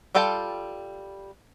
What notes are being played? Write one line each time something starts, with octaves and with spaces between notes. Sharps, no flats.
G3 F4 A4 G5 A5